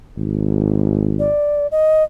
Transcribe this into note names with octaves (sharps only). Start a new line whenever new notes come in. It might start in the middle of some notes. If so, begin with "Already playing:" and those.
G#1
D5
D#5